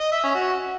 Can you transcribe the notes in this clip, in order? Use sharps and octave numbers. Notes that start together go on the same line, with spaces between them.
D#5
E5
C#4
F#4